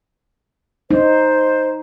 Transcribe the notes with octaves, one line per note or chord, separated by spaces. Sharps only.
D#4 C5